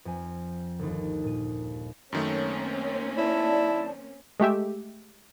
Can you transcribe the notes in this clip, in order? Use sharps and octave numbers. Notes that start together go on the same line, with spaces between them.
F2 G#5
G1 D#2
A#2 D#7
F#2 D#3 A3 A#3 C4 C#4
E4 D5 A5
G#3 A3 G4 E5